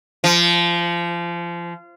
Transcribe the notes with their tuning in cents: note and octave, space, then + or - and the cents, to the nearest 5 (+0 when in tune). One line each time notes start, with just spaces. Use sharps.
F3 -25